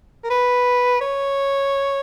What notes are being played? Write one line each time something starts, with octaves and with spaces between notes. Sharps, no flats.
A#4
B4
C#5